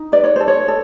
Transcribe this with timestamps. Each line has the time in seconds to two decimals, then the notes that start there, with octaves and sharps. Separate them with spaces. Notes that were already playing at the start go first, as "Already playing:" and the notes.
Already playing: D#4
0.12 B4 D5
0.24 C#5
0.36 A4 C5
0.48 C#5
0.68 A4